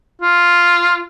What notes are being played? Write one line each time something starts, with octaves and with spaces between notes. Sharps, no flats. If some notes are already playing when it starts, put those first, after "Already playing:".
F4